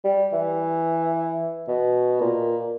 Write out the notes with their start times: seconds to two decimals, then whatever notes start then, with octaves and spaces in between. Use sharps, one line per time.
0.05 G3
0.33 E3
1.68 B2
2.21 A#2